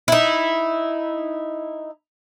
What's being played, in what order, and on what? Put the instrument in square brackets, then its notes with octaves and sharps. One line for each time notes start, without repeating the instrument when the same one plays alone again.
[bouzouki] D#4 E4